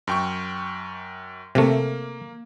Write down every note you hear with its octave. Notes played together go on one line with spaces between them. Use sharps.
F#2 G5 C#6
C3 A3 A#3